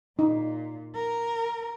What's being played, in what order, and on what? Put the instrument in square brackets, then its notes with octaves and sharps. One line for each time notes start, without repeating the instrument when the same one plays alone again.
[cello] A#2 [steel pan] D#4
[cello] A#4